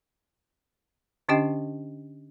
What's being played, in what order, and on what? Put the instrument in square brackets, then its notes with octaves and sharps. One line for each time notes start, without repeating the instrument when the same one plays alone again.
[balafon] D3 C#4 D4 G4 D#5 G5